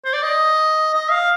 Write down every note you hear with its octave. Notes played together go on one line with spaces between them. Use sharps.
C5
D5
D#5
D#5
F5